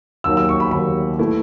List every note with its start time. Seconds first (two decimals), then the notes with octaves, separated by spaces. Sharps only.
0.24 D#2 D#3 F#3 E6
0.37 E6
0.49 C#6
0.60 B5
0.71 D#2 D#3 F#3 B5
1.19 E3 A3 E4